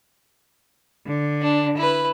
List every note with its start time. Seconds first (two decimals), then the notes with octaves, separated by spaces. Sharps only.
1.06 D3
1.41 D4
1.77 E4 B4